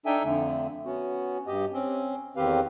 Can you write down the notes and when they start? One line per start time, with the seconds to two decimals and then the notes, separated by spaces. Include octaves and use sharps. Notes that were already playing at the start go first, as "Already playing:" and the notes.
0.06 D4 D#4 A4 E5 G5 G#5
0.24 F2 D3 A3
0.86 B3 C#4 F#4
1.47 G2 G4 D#5
1.73 C4 C#4
2.37 E2 D#3 C4 G4 B4 F5